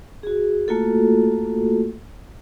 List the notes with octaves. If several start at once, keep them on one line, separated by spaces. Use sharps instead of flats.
F#4 G#4
A3 A#3 F4 F#4 A4